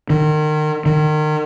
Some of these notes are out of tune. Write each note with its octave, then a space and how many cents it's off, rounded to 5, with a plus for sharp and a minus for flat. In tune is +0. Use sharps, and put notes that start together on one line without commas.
D#3 -30
D#3 -30